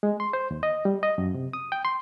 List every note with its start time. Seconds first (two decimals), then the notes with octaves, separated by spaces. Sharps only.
0.03 G#3
0.20 C6
0.33 C5
0.51 D#2
0.63 D#5
0.85 G3
1.03 D#5
1.18 F#2
1.34 C3
1.53 D#6
1.72 G5
1.85 C6